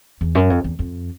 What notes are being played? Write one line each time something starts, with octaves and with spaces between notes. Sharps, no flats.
E2
F#2
F2
E2
F2